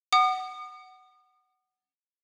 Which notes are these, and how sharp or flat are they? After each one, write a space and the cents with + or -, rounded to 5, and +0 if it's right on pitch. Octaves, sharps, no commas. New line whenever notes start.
F#5 +15 D#6 -40